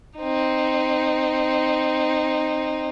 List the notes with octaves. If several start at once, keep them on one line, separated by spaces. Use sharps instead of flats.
C4 D#4